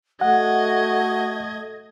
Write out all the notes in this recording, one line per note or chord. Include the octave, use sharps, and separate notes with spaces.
A3 F#4 D#5 F#5 G#6